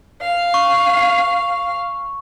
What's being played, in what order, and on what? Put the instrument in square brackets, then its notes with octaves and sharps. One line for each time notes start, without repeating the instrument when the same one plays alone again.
[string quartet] F5
[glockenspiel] C#6